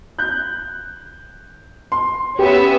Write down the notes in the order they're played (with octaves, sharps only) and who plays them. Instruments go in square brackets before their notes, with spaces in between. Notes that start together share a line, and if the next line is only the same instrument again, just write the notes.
[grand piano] F#6 G6
C6
[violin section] B3 C#4 E5 [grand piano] G4